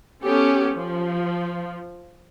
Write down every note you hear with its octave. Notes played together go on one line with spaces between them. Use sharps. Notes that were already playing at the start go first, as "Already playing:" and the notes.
B3 C#4 G4 A4
F3